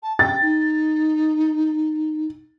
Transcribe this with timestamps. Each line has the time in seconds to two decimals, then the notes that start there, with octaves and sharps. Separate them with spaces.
0.03 A5
0.19 G5 A6
0.42 D#4